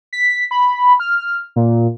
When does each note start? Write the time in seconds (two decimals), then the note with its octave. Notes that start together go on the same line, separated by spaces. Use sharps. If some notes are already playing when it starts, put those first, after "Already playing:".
0.13 B6
0.51 B5
1.00 F6
1.56 A#2